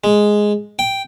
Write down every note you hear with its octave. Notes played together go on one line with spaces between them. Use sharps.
G#3
G5